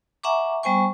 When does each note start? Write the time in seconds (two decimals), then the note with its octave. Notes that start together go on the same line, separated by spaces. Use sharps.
0.24 E5 F#5 G#5 A#5 C#6 D6
0.63 G3 B3 C5 G5 G#5 C#6